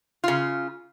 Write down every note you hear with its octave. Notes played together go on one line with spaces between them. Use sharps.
C#3 F4